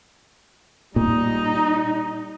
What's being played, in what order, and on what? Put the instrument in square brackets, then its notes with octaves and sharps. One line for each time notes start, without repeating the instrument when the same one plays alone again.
[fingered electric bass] A#2 [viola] G3 D#4